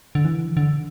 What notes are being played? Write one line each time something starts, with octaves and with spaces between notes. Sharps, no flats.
D3
E3
D3